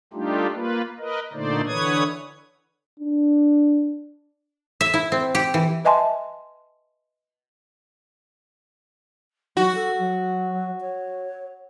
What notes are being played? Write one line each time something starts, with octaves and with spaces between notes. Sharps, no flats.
G3 A3 D4 D#4 F4 G4
A#3 F4 B4
A#4 B4 D#5
A#2 D3 A3 D#4 C5 D5
D3 E3 B4 C#5 D#6 G#6
D4
E5
E4
C4
G4
E3
B4 D#5 E5 G#5 A5 C6
F#3 F#4
A4
F#3
C#5